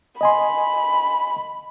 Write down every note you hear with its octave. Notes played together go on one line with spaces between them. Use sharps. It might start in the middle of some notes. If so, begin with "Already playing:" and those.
D#5 G#5 B5 C6